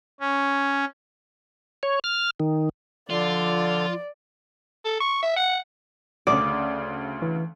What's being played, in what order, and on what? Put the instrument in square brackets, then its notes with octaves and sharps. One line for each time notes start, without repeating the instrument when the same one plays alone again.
[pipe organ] C#4
[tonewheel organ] C#5
F6
D#3
[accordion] D3 [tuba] F3 [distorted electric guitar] F4 [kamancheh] D5
[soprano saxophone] A4
C#6
E5
F#5
[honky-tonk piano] D2 C#3 [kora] D5 [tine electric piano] D#6
[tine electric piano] E3